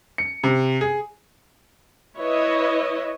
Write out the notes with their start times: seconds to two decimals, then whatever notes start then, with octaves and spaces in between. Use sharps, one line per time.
0.18 C#7
0.44 C3
0.81 G#4
2.18 E4 B4 C#5 D#5